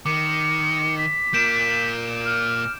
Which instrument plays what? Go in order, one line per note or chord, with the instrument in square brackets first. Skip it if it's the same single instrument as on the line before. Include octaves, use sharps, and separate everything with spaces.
[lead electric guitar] D#3 [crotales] D6 [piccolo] C#7
[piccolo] B6
[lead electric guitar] A#2 A#3 [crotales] G6 D7 E7
[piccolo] F6